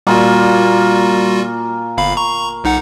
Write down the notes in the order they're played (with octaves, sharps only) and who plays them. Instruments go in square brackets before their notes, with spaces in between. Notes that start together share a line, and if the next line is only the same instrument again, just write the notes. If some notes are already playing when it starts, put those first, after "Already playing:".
[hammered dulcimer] A#2 A#3 [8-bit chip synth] G3 F4 F#4
[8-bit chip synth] G1 F5 B5
A#5 C#6
B1 D#4 F#5